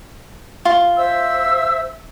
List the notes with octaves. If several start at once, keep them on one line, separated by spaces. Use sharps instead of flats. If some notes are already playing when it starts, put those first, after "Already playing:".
F4
C5 E5 E6